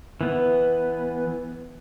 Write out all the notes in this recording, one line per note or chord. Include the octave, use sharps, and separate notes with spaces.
E3 B3